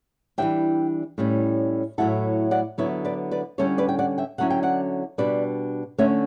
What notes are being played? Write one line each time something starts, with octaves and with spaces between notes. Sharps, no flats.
E3 G3 D4 E5 G5
A2 G3 C#4
A2 F#3 A3 E4 F#5 A5
D5 F#5
D3 F#3 B3 E4 C#5 E5
B4 D5
B4 D5
D3 G3 C#4 E4 A4 C#5
B4 D5
G5
D5 F#5
E5 G5
D3 F#3 C#4 E4 F#5
G5
D5 F#5
B2 G3 D4 B4 D5
D3 A3 C#4 C#5 E5